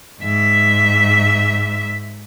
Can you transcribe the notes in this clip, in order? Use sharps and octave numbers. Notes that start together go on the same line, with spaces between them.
G#2 E5